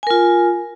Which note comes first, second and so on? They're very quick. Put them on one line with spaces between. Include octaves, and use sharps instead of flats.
G#5 A#4 F4